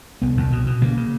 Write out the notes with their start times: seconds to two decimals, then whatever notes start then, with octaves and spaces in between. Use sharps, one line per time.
0.22 C2 B3
0.37 C2
0.52 B2
0.67 B2
0.82 C#3 A#3
0.97 C#3